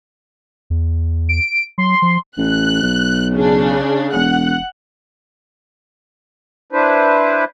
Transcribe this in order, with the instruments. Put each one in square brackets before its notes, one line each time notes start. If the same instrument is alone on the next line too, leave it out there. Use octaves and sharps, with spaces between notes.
[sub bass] E2
[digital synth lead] D7
[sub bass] F#3 [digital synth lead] C6
[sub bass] F3
[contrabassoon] A1 [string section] F#6
[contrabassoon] B1
[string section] C#3 D4
[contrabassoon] E1 [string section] F#5 F#6
[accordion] D4 E4 B4 C5